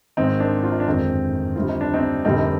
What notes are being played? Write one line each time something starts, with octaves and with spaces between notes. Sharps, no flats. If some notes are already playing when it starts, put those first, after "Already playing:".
G#1 G#2 D#3 C4 D#4
D4
F4
D#4
D4
G1 F2 D#3 G#3 C4 D#4
D2 C3 G3 F4
D#4
D4
C4 D#4
F1 F2 D3 G3 A#3 C4 D#4
D#4